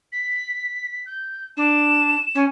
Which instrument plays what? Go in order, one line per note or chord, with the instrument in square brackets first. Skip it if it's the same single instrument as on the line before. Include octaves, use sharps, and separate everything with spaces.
[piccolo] B6
G6
[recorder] D4 [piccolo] E7
[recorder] C#4